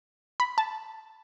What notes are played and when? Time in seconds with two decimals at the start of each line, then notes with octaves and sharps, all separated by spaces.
0.40 B5
0.58 A5